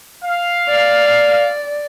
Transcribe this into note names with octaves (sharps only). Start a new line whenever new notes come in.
F5
D5